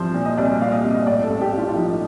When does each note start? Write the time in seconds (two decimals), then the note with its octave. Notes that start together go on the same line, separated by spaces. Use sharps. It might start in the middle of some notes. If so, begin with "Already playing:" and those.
Already playing: C2 F3 C5
0.14 A#2
0.25 D#5
0.37 C2 D5
0.61 A#2 F5
0.72 D#5
0.83 C2
0.94 D#5
1.07 A2 D5
1.23 A4
1.29 A1
1.41 G4
1.53 A1 F4
1.68 F4
1.76 F3 D#4